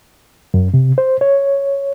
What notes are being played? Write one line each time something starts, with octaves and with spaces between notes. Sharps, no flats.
F#2
C3
C5
C#5